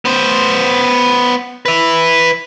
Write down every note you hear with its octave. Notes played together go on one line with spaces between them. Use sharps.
B3 C5
B4 E5